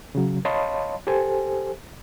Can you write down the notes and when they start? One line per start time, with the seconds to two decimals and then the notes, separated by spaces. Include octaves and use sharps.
0.15 C#3 F#3
0.45 C#5 D#5 F5 A5 B5 C6
1.07 G4 A4 C5 G#5